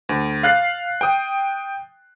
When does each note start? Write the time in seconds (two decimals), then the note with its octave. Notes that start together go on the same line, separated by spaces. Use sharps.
0.09 D2
0.43 F5 F#6 A6 C7
1.01 G5 D#6